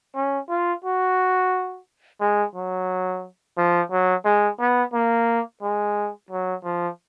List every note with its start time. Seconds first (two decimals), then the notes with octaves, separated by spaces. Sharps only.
0.15 C#4
0.49 F4
0.84 F#4
2.20 G#3
2.55 F#3
3.57 F3
3.91 F#3
4.25 G#3
4.59 B3
4.94 A#3
5.62 G#3
6.30 F#3
6.64 F3